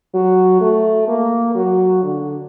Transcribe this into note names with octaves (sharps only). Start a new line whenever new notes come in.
F#3
A3
A#3
F#3
D3